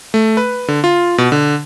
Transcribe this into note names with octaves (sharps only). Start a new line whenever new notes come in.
A3
B4
D3
F4
B2
D3